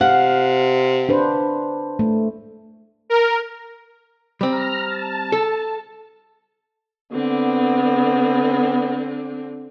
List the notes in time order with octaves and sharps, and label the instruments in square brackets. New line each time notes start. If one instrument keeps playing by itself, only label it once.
[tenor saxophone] C3 [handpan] F5 [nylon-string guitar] F#5
[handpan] D4 B4 C5
A3
[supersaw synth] A#4
[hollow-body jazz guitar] G3 C4 [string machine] A#5 F6
[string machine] A5
[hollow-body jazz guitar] A4
[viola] D3 C4 [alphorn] B3